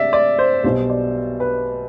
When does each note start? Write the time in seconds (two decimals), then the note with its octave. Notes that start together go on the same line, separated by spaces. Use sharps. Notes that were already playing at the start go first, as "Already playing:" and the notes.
Already playing: C3 G3 D5 E5
0.13 D5
0.39 C5
0.64 B1 B2 G3 C5
0.90 D5
1.40 B4